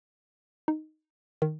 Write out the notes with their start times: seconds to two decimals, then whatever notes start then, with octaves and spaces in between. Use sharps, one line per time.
0.68 D#4
1.42 D#3